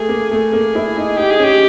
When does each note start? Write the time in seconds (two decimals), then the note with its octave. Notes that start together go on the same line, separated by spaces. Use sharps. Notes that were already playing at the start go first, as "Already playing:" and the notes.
Already playing: A3 G#4
0.09 A#3
0.31 A3 G#4
0.53 A#3
0.75 E4
0.97 D#4
1.18 D#4 G4
1.31 G#4
1.40 C#4 G4